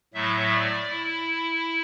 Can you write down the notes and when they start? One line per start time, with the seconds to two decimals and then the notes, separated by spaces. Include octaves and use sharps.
0.14 A2 F#3 A3 E5
0.52 D5
0.89 E4